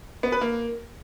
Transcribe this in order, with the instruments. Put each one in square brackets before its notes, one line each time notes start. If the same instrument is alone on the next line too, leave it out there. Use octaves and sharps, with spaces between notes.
[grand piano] B3
B4
A#3